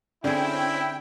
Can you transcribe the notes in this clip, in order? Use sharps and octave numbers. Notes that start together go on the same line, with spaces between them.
D3 C4 C#4 E4 G#4 G5